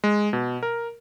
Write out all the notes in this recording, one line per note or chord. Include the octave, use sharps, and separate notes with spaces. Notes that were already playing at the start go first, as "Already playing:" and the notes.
G#3
B2
A#4